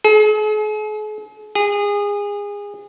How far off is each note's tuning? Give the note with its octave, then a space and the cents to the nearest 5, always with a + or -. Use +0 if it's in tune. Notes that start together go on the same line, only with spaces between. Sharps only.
G#4 +45
G#4 -25